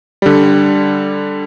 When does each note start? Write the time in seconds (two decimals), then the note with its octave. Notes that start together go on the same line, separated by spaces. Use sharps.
0.22 D3 G3